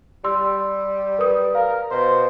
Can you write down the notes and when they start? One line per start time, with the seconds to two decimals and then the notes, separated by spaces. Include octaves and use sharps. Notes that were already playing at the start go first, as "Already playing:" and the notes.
0.24 G3 C6 E6
1.19 A#4 B4 D#6
1.55 A#4 F5
1.91 B2 C5